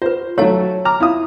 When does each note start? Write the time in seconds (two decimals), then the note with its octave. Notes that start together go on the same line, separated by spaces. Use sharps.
0.02 F4 B4 C5
0.38 F#3 A3 C#5 F5 A5
0.85 A#5 D6 F6
1.00 E4 F4 D#6